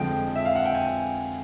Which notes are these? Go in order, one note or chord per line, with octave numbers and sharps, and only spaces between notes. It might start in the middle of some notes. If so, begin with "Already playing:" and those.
Already playing: F2 D3 F3 G#3 G5
E5
F5
F#5
G5
G#5